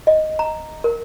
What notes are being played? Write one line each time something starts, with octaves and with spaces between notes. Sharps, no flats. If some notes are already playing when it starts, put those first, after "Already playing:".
D#5
A#5
A#4